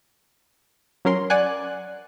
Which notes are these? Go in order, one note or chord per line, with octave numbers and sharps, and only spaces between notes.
F#3 C#4 A#4 C6
D5 F#5 G#5 F#6